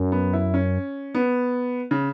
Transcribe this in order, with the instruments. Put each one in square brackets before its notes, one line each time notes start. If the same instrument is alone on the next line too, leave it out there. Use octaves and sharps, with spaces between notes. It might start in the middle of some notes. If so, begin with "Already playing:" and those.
Already playing: [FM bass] F#2
[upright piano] B3
E4
C#4
B3
C#3